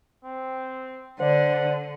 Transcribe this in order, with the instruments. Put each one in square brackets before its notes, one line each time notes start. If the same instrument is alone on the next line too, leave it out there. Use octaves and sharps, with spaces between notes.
[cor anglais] C4
[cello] D3 [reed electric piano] C5 D5 [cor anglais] F#5